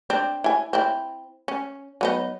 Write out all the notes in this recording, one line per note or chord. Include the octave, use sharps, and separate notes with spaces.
C4 D4
E4 G#5
C4 E4
C#4
F#3 B3 D#4